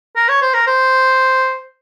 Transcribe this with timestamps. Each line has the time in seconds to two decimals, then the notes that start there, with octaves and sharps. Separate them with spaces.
0.16 A#4
0.28 C#5
0.42 C5
0.54 A#4
0.67 C5